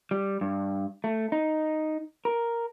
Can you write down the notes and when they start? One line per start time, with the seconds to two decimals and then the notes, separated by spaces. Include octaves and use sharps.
0.11 G3
0.41 G2
1.04 A3
1.32 D#4
2.25 A#4